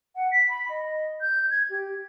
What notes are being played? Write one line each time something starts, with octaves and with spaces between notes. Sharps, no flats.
F#5
B6
B5
D#5
G6
G#6
G4